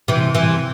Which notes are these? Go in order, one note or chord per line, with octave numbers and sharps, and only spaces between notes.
C3 E3
C3 E3